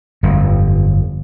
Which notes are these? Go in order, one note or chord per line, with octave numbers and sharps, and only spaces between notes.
G1 F2